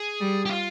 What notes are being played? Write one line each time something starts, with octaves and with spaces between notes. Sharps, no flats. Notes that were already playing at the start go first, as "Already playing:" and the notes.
Already playing: G#4
G3
G4
F4